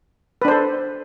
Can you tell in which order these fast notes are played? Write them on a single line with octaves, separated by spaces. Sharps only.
B4 D4 C5 A4